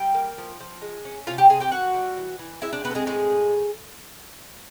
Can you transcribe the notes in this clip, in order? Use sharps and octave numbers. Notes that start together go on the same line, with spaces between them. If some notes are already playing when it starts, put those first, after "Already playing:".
Already playing: G3 G5
A#3
F3
F3
G#3
C#4
C3 F4 F5
G4 G5
C3 G#4 G#5
G4 G5
D#3 F#4 F#5
G3
E3
E3
G#3 E4 E5
D4 D5
B3 C4 B4
A4
G#3 G#4
A2 G#3 G#4
A2